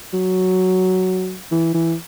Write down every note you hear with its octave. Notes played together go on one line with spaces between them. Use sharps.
F#3
E3
E3